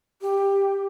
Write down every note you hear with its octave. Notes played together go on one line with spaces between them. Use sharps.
G4